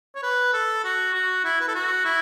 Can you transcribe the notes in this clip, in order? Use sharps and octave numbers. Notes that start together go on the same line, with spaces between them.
C#5
B4
A4
F#4
F#4
E4
B4
A4
F#4
E4